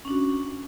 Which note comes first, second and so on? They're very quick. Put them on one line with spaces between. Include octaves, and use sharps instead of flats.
C#4 D4 F#4